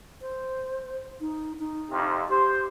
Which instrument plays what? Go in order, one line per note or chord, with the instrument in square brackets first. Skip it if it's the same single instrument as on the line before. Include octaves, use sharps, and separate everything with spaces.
[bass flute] C5
D#4
D#4
[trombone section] F2 C3
[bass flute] G4 [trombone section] C5